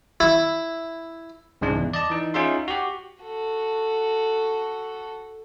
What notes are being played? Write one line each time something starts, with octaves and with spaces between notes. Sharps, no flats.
E4
C2 G#2 C#3 G#3 D4
E2
D5 D#5 A5
E3 D#4
C#4 D#4 F4 G#4 E5 C6
F#4 G4
F#4 A4